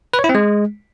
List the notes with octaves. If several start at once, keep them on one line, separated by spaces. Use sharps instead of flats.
B4
C#5
E4
C4
G#3